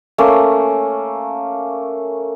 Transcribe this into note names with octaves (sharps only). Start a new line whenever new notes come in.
A3 A#3 C#4